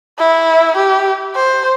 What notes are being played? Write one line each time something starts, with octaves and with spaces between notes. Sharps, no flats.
E4
G4
C5